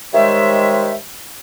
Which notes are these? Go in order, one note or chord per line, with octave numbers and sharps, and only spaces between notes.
D#3 G3 G#3 C5 C#5 E5